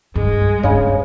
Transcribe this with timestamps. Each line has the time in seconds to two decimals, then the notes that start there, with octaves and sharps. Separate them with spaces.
0.15 G2 G#3
0.63 G2 C#3 D4